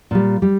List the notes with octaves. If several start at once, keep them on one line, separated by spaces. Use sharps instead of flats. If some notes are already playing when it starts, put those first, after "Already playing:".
A#2 G3
G3